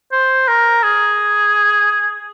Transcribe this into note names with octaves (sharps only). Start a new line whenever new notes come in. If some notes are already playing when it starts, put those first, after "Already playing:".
C5
A#4
G#4